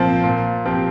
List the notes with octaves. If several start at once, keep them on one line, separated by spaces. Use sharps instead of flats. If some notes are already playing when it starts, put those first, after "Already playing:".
Already playing: A#2 F3 C4
A#2
F3 C4 G4